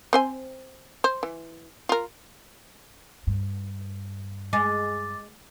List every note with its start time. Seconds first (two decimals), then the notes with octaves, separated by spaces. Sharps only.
0.13 C4 C5 G#5
1.04 C5
1.23 E3
1.89 F4 A#4
3.27 G2
4.53 G#3 D6 A6